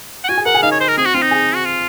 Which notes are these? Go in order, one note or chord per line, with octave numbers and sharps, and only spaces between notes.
F#5
F#4 G#5
G#4
A#4 F#5
G#4
D#4 F5
C#5
C5
A#4
C4 G#4
F#4
C4 F4
D#4
G#4
F#4
F4